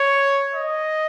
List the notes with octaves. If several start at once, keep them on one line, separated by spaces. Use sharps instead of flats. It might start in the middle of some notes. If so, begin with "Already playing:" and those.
Already playing: C#5
D#5